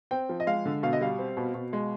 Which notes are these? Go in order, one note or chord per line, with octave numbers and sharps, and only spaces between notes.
C4 G5
F3
D#5
G#3 F5
D3
B2 F5
D#5
G3 F5
C4
B2
B2
G#3